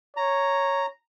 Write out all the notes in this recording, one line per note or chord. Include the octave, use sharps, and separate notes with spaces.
C#5 A#5